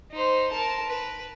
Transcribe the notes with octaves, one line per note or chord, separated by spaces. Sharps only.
D#4 C5
A#4 A5
B4